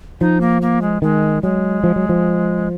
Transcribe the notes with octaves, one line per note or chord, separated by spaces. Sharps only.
F3 D#4
A#3
A#3
G#3
D#3 G#3
F#3 G#3
F3
F#3
F3